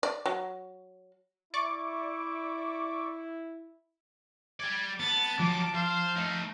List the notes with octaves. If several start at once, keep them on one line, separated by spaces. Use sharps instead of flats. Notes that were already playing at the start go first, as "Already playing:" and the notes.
D5
F#3
E4 D5 C#6 D6
G3 D5 G#6
B3 A5 A6
F3 F#3 F4 D6
C5 F5
A3 D#4